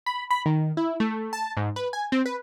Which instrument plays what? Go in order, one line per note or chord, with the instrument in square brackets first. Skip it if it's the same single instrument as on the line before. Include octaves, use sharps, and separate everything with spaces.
[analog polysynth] B5
B5
D#3
E4
A3
A5
G#2
B4
G#5
C4
B4